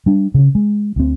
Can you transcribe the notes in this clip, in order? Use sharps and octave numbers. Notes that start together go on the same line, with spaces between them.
G3 D4
C#3 C#4
G#3
D2 C4